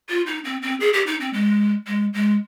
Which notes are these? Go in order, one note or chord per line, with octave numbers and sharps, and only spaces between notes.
F4
D#4
C4
C4
G#4
G4
D#4
C4
G#3
G#3
G#3